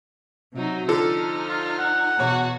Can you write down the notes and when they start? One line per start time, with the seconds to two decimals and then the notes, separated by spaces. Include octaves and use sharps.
0.54 C3 F#3 D#4
0.88 D3 F3 D#4 A4 F6
1.48 F4
1.78 F#5
2.19 E2 B2 F#4 C#5